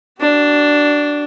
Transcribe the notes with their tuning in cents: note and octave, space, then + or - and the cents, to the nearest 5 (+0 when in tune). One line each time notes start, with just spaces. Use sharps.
D4 +0 F#4 +40